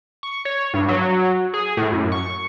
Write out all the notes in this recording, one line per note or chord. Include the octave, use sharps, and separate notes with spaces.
C#6
C#5
G2
F#3
G#4
A2
F#2
C#6